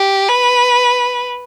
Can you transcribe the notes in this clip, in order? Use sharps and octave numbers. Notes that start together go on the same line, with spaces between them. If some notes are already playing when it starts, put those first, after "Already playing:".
Already playing: G4
B4